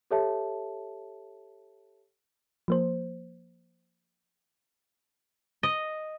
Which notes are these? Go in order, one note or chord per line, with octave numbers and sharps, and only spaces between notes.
G4 A4 C#5 E5 A5
F3 A#3 C5
D#5